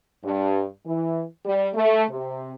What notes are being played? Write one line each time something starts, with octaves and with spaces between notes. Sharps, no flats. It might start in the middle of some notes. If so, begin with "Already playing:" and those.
G2
E3
G3
A3
C3